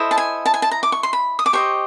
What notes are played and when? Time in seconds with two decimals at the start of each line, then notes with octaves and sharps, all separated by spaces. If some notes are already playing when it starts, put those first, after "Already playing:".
Already playing: E4 A4 C5 D#5
0.11 A5
0.18 G#5
0.46 A5
0.54 G#5
0.62 A5
0.71 A#5
0.83 D6
0.92 C#6
1.03 C6
1.13 B5
1.39 D#6
1.46 D6
1.53 G4 C5 D#5 C#6